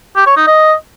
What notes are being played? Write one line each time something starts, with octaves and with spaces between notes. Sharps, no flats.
G4
C#5
D#4
D#5